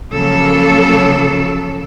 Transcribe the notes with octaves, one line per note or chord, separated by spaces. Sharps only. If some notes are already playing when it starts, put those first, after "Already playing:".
C#3 F3 F#3 A#3 A4